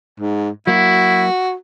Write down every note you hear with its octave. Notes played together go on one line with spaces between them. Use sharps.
G#2
F#3 A#3 E4 F#4